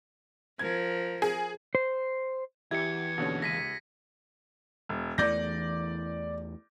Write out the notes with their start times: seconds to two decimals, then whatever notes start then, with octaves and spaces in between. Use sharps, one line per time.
0.59 F3 A#4 G#6
1.22 G#4
1.75 C5
2.71 E2 E4 G4 G#6 C#7
3.18 D#2 B2 D3 C#4
3.42 C#2 A#6 B6 D#7
4.89 E1
5.18 E2 E3 A3 D5 G6 A#6